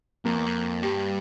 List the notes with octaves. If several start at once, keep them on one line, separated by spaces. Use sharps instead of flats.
F2 A#3
E2
F2
G2 G3